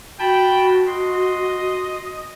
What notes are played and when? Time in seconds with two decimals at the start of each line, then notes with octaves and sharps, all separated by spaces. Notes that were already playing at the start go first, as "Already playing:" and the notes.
0.20 F#4 G5 A5 B5
0.87 D#5 C6